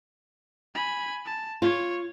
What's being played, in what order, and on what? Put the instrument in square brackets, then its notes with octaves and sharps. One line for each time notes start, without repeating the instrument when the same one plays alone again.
[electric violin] G#5 B5
A5
[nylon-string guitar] F4 [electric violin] C#5